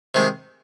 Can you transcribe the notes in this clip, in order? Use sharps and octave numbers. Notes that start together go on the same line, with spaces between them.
C3 D#3 G#3